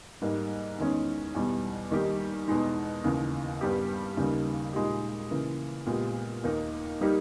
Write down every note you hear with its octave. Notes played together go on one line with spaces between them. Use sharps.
G#2 G3 A#3 D#4
E2 D#3 G#3 C#4
E2 B2 G3
D#3 G3 A#3 D#4 G4
E2 B2 G#3 D#4
D#2 C#3 E3
G2 G3 B3 G4
D#2 C#3 G3 A#3 D#4
A#2 G#3 D#4 G4
C#3 E3 A#3
A#2 G#3 B3 G4
D#2 D#3 A#3 D#4
G3 A#3 D#4 G4